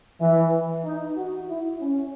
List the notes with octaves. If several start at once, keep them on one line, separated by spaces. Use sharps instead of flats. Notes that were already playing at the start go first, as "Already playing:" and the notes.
E3
D#4
F#4
E4
C#4